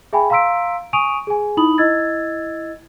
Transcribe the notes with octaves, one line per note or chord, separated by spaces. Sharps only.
G#4 E5 G5 G#5 B5
F5 A#5 C6 E6 B6 D7
G#5 C#6 D#6 D7 D#7 F7
G#4 G#5
D#4 E4 B5 D#6 F#7
E4 D#5 E6 G#6 A6